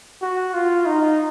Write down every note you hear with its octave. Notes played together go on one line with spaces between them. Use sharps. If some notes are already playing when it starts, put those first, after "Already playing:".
F#4
F4
D#4